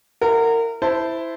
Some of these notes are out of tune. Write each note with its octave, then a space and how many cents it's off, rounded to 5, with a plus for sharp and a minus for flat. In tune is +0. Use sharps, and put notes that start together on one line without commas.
E4 +20 A#4 -25 F#5 +0
E4 +0 C5 -15 A5 +0